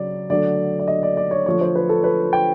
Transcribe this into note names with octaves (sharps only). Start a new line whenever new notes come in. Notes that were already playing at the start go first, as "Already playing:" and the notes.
Already playing: C#3 F#3 D5
D3 F#3 A3 D5
D5
D#5
D5
D5
C#5
D3 F3 A3 C#5
C5
B4
A4
B4
G5